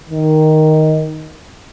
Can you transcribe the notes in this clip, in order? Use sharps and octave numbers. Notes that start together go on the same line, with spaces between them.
D#3